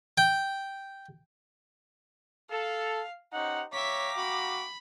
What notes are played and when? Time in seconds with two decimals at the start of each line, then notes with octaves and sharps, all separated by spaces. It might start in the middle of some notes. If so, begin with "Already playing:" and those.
0.18 G5
2.51 A4 F5
3.33 C#4 D#4 G4 C5 F#5
3.73 C#5 E5 F5 G5 A#5 D6 B6
4.17 F#4 B5